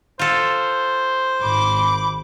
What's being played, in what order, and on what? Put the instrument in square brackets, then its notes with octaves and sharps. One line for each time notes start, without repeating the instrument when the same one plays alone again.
[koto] F4 A4 [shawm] C5
[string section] G#1 D6 [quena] B5